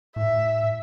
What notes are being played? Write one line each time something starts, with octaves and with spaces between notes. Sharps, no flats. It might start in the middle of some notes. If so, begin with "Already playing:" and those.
A2 E5